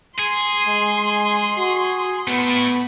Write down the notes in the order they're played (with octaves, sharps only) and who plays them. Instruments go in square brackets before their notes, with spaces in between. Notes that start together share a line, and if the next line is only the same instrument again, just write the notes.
[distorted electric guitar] G#4 [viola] C6
[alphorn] G#3
F#4
[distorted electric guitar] A3 E4 [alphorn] B3